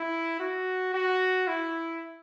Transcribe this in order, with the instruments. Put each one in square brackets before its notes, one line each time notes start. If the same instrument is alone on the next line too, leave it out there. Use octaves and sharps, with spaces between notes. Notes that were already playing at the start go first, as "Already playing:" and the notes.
Already playing: [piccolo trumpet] E4
F#4
F#4
E4